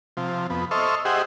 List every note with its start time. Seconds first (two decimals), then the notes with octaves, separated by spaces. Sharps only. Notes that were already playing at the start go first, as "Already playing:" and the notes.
0.17 C3 F3
0.50 F2 B3
0.71 A4 C5 D#5 E5 C#6 F6
1.05 G4 G#4 C5 D#5 E5 F#5